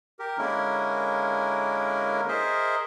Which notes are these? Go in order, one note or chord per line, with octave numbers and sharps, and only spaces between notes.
G4 A#4
D3 G#3 A#3 C#4 E4 A#4
G#4 A#4 C5 D#5 E5